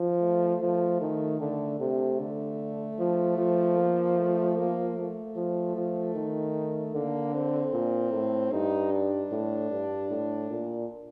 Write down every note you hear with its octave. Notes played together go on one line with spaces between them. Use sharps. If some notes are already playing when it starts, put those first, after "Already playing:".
Already playing: F3
A3
F3
D#3
D3 A3
C3 A3
D3
F3
F3
A#3
A3
A#3
A3
F3
F3
D#3
D3 A#3
C4
A#2
A2
G2 D#4
D4
A2
G2
A2
A#2